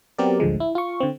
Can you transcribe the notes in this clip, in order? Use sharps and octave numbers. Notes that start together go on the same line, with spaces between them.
F#3 B3 C4 G4 A#4 D5
A1 D2 D3 F3 G#3
E4
F4 C#6
D3 C4